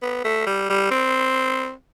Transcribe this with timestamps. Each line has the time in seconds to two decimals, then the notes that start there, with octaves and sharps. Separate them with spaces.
0.02 B3
0.24 A3
0.46 G3
0.69 G3
0.91 C4